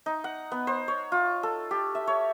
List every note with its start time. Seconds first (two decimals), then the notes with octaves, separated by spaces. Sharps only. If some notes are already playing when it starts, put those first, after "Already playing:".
0.06 D#4
0.24 F#5
0.52 B3
0.67 C5
0.88 C#5
1.12 F4
1.43 A4
1.71 G4
1.95 E5
2.07 C#5